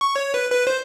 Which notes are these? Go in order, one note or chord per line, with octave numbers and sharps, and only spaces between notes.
C#6
C#5
B4
B4
C5